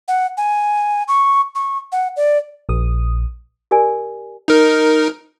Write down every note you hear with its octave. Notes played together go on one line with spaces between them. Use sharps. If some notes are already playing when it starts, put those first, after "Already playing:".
F#5
G#5
C#6
C#6
F#5
D5
A#1 D#6
G4 A#4 D5 G#5
D#4 A#4